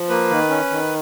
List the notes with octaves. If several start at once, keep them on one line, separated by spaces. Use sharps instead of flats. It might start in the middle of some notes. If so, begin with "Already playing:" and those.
Already playing: F3
A#3 B4
D#3
C#4
D#3